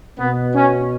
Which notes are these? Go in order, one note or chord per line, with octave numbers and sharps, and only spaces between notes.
B2 B3
C#4